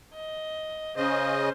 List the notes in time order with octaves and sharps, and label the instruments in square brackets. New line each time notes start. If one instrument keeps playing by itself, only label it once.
[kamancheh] D#5
[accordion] C#3 D#5 [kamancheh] C#4 C5